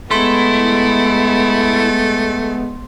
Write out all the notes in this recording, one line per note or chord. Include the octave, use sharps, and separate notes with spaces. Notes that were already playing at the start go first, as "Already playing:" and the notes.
G#3 A3 B3 E4 C6